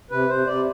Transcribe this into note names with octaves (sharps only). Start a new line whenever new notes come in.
C3 B4
C3 C5
C3 D5